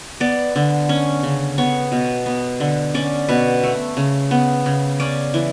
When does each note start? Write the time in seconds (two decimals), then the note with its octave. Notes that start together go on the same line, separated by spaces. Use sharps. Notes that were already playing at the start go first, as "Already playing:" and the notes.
0.20 B3 D5
0.56 D3
0.89 C#4
1.23 C#3
1.58 B3 C#5
1.92 B2
2.26 B3
2.60 D3
2.94 C#4 D5
3.29 B2 B4
3.63 A3
3.97 C#3
4.31 B3
4.66 C#3
5.00 C#4 D5
5.34 E3